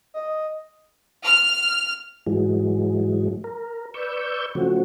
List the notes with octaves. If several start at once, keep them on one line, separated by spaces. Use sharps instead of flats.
D#5
F6
G#2 E3 F#3 G#3
A#4
B4 D5 C#6 E6 G6
C#3 F3 F#3 A3 C4 F#4